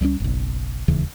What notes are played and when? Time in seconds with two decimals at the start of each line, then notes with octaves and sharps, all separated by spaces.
0.01 C#2 G3 A3 C#4
0.20 F#1 B1
0.88 E1 D#2 C#3 E3